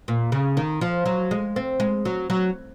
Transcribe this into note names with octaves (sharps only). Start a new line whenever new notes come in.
A#2
C#3
D#3
F3
F#3
G#3
C4
G#3
F#3
F#3